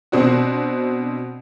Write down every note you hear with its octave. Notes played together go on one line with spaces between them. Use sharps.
B2 C4 D4 F#4